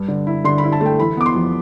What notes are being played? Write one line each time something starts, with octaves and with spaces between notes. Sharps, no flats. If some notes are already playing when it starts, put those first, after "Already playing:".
Already playing: G2
D3
E4
D3 C6
B5
E4
A5
A3 G5
E3 B5
B3 D6
C6
F2